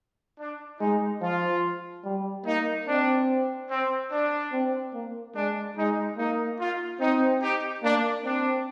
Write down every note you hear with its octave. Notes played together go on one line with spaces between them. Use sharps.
D4
G#3 D#4
F3 F4
G3
A#3 D#4
C4 D4
C4
D4
C4
A#3
G#3 D4
G#3 D#4
A#3 D#4
F4
C4 D#4
D#4 G4
A#3 D4
C4 D4